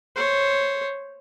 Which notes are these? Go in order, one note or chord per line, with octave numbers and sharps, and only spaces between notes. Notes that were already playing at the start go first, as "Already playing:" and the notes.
C5 C#5